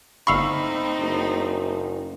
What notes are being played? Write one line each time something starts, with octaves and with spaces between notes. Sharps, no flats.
G1 A3 C4 D#4 F5 B5 C#6 E6
F#1